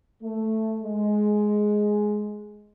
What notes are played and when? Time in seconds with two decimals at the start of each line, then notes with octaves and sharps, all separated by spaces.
0.23 A3
0.82 G#3